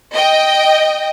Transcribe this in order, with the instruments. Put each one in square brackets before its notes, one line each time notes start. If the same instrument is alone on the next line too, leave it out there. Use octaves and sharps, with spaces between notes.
[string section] D#5 G5